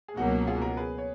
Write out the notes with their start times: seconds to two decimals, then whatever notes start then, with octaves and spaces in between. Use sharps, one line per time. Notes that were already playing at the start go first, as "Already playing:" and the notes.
0.08 G#4
0.17 C#2 B2 F#3 A#3 D#4 F#4
0.47 F4 G#4
0.62 F#4 A#4
0.77 G#4 B4
0.98 C#5